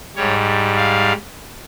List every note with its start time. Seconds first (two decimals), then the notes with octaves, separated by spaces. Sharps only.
0.16 G#2 G3 C#5
0.77 F5